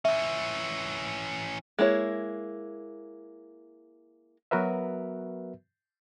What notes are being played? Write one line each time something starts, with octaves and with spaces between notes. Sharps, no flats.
E3 C#4 E5
G#3 A#3 E4 C#5
F#3 B3 F#4 A#4 B4 E5